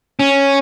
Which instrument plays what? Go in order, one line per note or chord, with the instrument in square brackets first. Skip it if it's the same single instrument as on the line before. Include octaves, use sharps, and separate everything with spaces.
[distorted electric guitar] C#4